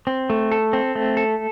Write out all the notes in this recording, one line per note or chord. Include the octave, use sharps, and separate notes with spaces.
C4
A3
A4
C4
A3
A4